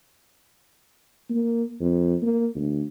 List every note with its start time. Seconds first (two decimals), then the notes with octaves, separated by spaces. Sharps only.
1.30 A#3
1.80 F2
2.22 A#3
2.55 D2